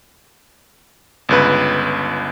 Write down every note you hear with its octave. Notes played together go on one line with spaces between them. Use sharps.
G1 C#2 B4